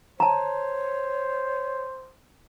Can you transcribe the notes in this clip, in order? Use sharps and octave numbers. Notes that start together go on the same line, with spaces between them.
C5 C#5 A5 A#5